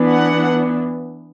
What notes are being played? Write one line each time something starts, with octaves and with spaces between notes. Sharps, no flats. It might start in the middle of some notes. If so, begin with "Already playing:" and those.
Already playing: E3 B3 D4
F#5